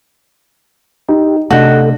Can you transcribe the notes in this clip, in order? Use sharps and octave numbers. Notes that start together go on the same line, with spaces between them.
D#4 G4
C3 A3 D4 F#4 A4 D#5 G5